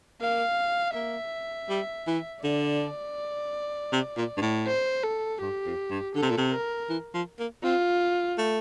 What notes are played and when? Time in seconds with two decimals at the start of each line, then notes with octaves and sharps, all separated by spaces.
0.21 A#3 F5
0.95 A#3 E5
1.69 G3
2.07 E3
2.44 D3 D5
3.92 C3
4.17 A#2
4.37 G2
4.42 A2
4.67 C5
5.04 A4
5.41 G2 G4
5.66 F2
5.91 G2
6.15 D3 A4
6.22 C3
6.30 A#2
6.37 C3
6.52 A#4
6.89 E3
7.14 F3
7.39 A#3
7.64 C4 F4
8.38 A3